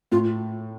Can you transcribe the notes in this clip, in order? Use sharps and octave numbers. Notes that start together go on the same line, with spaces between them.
A2 F4